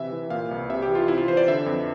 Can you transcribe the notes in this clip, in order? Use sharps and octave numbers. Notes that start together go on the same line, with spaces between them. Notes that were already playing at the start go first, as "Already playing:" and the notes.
Already playing: C3 E3 E5
E3
A#2 F5
C2
C3 E5
G4
E3
F4
C3 E4
F4
E3 C5
D5
D3 E5
F2